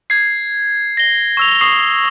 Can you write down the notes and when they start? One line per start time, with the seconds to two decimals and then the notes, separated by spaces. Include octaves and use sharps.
0.10 G#6 C7
0.97 A#6 G7
1.37 C#6 E6 F7
1.61 C#6 D#6 C7